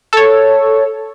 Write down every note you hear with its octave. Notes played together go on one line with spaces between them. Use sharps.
A4 C#5